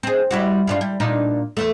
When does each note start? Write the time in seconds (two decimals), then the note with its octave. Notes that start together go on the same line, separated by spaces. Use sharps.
0.03 C4 G#4
0.31 G3 E4 F#4
0.67 G2 D4 F4
0.81 G3
1.00 A#2 D4 D#4
1.57 E2 A3